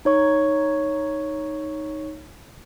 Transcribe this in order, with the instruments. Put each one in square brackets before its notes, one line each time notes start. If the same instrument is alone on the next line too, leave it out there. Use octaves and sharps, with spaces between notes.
[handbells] D#4 C#5 C#6